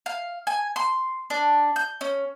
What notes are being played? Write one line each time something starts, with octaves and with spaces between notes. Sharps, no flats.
F5
G#5
C6
D4
G6
C#4